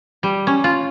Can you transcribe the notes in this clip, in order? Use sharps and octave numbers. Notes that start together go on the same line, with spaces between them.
G3
C#4
F4